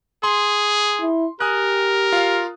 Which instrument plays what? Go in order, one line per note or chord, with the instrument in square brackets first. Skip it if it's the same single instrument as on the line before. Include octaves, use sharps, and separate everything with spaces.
[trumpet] G#4 [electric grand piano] C6
[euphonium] E4
[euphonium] G4 [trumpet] A#4 [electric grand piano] G#5 D#6 F#6
[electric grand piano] F4 F5